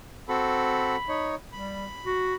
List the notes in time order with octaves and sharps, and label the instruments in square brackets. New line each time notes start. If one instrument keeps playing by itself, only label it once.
[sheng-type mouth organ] C4 F#4 A4 [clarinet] B5
[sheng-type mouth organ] D#4 C#5
[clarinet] G3 [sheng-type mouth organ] B5
[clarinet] F#4